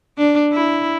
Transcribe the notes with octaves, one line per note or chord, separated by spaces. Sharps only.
D4
E4